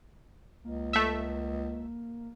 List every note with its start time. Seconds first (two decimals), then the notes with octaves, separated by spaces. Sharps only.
0.64 C#2 A#3
0.93 A3 E5